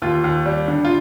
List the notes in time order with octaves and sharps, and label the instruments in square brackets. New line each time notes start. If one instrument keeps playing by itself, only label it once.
[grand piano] D#2 F4
D#2
G3
D3
F4